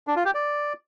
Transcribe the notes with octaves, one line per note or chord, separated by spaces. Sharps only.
D4
F4
G4
D5